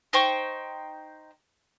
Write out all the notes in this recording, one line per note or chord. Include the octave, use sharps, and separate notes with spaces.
D#4 C5 G5 C#6